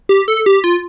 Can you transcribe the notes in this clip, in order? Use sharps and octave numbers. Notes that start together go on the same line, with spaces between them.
G4
A4
G4
F4